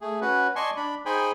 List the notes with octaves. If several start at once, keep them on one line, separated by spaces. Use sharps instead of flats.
A3 G#4
C#4 F#4 B4
D5 D#5 G#5 A5 C6 C#6
D4 B5
D#4 G#4 C5 G5 G#5 B5